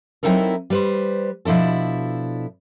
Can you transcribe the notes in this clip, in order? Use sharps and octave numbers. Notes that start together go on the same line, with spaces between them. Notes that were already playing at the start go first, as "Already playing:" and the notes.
F#3 C4 D#4 E4 A4 A#4
G3 B4 C5
B2 F3 D4 E4 A4